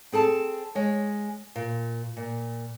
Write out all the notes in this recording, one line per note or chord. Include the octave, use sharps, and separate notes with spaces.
C4 G#4 A4 A5
G#3 C#5
A#2
A#2